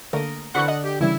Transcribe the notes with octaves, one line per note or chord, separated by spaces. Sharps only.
D3 A3 A#3 A#4 D#5
D3 E3 C4 F#5 B5 C#6 F#6
D#5 F#5
G4
C#3 E3 G3 E4